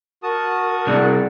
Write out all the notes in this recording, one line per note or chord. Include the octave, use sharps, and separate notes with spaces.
F#4 A#4 A5 D#6
C2 G#4 D5 F#5